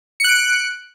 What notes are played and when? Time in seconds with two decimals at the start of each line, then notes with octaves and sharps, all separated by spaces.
0.20 C#7
0.24 F#6
0.29 D7